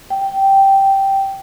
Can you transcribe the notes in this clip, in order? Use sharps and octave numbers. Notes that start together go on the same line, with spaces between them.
G5